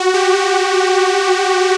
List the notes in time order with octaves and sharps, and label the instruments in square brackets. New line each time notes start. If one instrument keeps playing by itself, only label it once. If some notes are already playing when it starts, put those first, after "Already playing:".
Already playing: [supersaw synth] F#4
G4